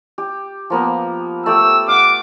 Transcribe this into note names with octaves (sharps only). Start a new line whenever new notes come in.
G4
F3 A#3 B3
A3 G4 G5 E6
F5 F#5 D6